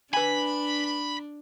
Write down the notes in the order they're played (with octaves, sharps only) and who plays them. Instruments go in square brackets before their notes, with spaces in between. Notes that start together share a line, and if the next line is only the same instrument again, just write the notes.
[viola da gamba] D4 [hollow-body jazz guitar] B4 G#5 [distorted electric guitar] B5